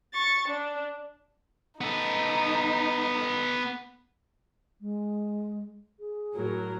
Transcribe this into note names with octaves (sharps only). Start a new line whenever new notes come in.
C#6 A6
D4
B3 D#4 A4
G#3
G#4
A2 F#3 A#4